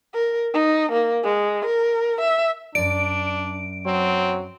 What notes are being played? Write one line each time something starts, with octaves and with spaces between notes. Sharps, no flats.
A#4
D#4
A#3
G#3
A#4
E5
F#2 D4 D5 D7
F#3 C4